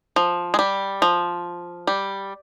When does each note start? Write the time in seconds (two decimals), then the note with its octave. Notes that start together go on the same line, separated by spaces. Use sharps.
0.16 F3
0.54 G#3
0.59 G3
1.02 F3
1.87 G3